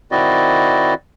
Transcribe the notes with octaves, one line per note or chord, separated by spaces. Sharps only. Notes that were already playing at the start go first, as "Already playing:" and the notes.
D#3 C4 E4 F#4 D5 D#5